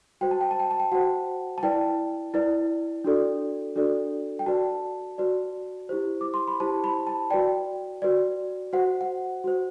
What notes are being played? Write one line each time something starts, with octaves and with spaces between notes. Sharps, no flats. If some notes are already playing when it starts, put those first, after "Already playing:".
F#4 C5 G5
A5
G5
A5
G5
A5
G5
F#4 C5 F#5
A5
E4 B4 D5 G5
E4 B4 D5
D4 F#4 A4 D5
D4 F#4 A4 D5
G5
F#4 B4 D5 A5
F#4 B4 D5
E4 G4 C5
D6
C6
B5
E4 G4 C5 A5
B5
A5
F#4 B4 D5 G5
F#4 B4 D5
F#4 C5 F#5
F#5
F#4 C5